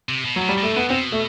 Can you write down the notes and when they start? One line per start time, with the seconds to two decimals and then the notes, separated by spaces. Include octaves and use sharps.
0.09 C3
0.25 B2
0.36 F#3
0.41 A2
0.49 G3
0.58 A2
0.63 A3
0.74 B2 B3
0.89 B2 C4
1.12 A3